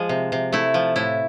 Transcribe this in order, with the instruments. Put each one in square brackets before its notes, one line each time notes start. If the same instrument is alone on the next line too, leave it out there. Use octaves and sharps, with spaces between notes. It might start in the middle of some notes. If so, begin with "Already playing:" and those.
Already playing: [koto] F3 G#3 G#4
C3
C3
A3 E4
F3
A2 E4